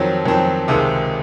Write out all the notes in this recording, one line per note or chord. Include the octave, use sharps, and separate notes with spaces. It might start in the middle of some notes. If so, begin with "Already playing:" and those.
Already playing: F2 D#3 F#3 C4
F2 D#3 F#3 C4
C#2 C3 D#3 G#3